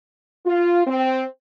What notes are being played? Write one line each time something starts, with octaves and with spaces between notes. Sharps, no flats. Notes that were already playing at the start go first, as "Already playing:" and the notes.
F4
C4